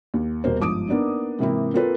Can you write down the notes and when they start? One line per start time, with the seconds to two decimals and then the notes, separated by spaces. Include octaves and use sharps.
0.14 D#2
0.44 D#1 B2 A#3 C5
0.59 G1 G#2 F3 D6 D#6 D7
0.89 A#3 B3 D4 D#4
1.39 G#2 C3 E3 A#3 C4 E4
1.74 A#3 C4 F4 A4 B4